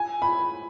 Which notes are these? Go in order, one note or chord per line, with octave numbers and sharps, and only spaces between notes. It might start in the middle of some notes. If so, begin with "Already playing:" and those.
Already playing: G#5
B5